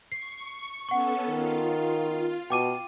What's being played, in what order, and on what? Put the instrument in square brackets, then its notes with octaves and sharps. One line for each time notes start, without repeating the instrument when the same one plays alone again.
[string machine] C#6 [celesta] C7
[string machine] B3 C#4 A4 [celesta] F#5 C#6
[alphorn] D#3 [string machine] F4
[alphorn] B2 [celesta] G5 D6 D#7